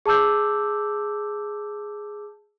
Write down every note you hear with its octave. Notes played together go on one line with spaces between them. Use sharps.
G#4 A5 D6 E6 G6